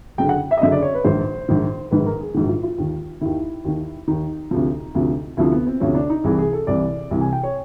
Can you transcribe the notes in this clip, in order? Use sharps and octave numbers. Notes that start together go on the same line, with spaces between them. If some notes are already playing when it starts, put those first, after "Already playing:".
F#1 F#2 D3 G5
F#5
E5
D#5
F#1 F#2 D3 E5
D5
C#5
B4
A#1 G#2 D#3 C5
A#1 G#2 D#3
A#1 G#2 D#3 B4
A#4
G#4
A#1 G#2 D#3 F#4
F4
F4
D#2 D#3
D#2 D#3 E4
D#2 D#3
D#2 D#3 D#4
D2 C3 F3
D2 C3 F3
D2 C3 F3 E4
B3
C4
D2 C3 F3 C#4
D4
D#4
C2 C3 E3 G#4
G#4
A4
C2 C3 E3 D5
C2 C3 E3
G#5
G5
C#5